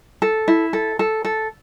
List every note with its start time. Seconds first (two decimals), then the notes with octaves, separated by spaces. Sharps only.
0.22 A4
0.48 E4
0.73 A4
0.99 A4
1.25 A4